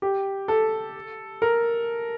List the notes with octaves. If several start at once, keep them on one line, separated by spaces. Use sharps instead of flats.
G4
A4
A#4